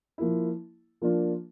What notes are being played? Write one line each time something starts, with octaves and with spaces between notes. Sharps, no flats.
F3 A#3 E4
F3 A#3 D4 F4